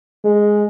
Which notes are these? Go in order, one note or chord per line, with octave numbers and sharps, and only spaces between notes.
G#3